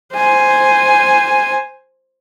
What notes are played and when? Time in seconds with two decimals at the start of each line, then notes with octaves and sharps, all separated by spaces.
0.14 C5 G#5